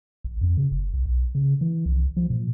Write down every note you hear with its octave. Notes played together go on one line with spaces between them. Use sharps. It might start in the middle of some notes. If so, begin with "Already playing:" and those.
A1
F2
C#3
F#1
B1
B1
C#3
E3
C2
F3
A#2